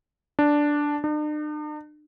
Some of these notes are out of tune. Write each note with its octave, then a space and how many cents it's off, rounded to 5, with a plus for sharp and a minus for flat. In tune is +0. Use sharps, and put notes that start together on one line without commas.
D4 -5
D4 +45